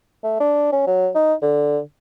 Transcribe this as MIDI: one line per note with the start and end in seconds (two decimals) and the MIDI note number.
0.23 0.37 57
0.40 0.67 62
0.72 0.84 61
0.87 1.09 54
1.15 1.34 63
1.42 1.79 50